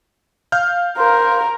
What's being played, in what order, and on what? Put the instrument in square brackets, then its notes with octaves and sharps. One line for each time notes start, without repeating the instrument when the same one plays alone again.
[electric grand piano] F5 F6 G6
[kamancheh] A#4 [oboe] C5